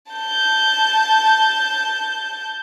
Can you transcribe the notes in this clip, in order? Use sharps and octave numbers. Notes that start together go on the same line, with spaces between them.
A5 G6